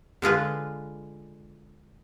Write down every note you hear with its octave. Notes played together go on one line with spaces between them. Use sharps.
D3 G#3 F4 B4